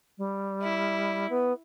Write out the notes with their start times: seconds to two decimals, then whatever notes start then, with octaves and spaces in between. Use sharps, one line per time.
0.18 G3
0.62 E4
1.30 B3